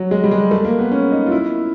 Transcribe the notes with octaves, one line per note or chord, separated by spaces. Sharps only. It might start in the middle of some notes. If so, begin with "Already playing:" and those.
Already playing: F#3
G#3
G3
G#3
A3
A#3
B3
C#4
D#4
F4
E4